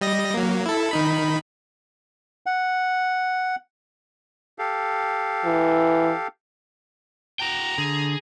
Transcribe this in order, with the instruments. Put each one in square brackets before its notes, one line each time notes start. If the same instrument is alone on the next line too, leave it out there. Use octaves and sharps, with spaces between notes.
[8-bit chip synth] G3 D#5 A#6
F#3 A#3
E4 A4
D#3 D#4 B5
[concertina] F#5
G4 A4 F5
[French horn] E3
[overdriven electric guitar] F#4 G5 [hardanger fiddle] A#5
[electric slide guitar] D3 [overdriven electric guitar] G#4